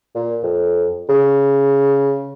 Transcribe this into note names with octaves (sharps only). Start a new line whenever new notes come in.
A#2
F2
C#3